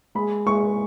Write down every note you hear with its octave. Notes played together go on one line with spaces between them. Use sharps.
G#3 B5
G#3 C#6